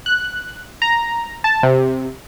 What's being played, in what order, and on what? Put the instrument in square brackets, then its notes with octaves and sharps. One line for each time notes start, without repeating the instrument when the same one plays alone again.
[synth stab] F#6
A#5
A5
C3